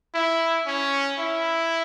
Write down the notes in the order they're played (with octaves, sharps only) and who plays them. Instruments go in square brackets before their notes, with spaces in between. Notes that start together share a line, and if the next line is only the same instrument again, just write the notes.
[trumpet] E4
C#4
E4